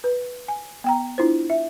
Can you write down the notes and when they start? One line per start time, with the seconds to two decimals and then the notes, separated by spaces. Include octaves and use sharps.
0.04 B4
0.48 G#5
0.84 B3 G5 A#5
1.18 D4 E4 F4 C5
1.50 E5